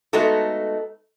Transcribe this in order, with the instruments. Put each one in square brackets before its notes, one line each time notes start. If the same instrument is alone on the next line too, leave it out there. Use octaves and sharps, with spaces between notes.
[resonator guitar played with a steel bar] G#3 A3 B3 D#4 F#4 A4